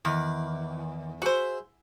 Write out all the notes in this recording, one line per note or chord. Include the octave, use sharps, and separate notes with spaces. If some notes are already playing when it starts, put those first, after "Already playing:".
E2 D#3 D5
F#4 G#4 C5 E5